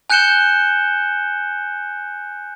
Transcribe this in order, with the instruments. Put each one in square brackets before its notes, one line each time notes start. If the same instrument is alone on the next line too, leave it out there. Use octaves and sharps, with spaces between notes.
[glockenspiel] G#5 F#6 G6 C#7 E7 G7